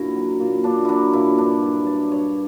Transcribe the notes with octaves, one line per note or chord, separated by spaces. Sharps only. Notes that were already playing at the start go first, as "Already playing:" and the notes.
Already playing: F#2 A#2 D3 E4 F#4
F#3
A#2
A#2 D4
F#3 D4 E4
A#2 E4
G2 D4
F#3 E4
G2 D5
G2 C#5